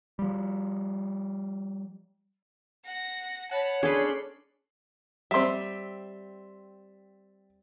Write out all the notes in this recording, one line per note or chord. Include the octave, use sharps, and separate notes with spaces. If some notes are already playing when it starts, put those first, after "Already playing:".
F3 G3
F#5 A#6
C#5 F#5 A5 B5
C#4 D4 G#4 A4 B4 B5 C6
G3 C4 E5 C6